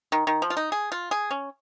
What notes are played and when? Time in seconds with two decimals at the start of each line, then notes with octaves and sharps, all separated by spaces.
0.12 D#3
0.27 D#3
0.42 F3
0.50 F4
0.57 D#4
0.72 G#4
0.92 F4
1.11 G#4
1.31 C#4